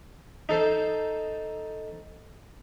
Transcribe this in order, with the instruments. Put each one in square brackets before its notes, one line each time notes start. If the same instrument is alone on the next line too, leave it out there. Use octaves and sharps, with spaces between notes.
[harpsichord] D#4 A4 C5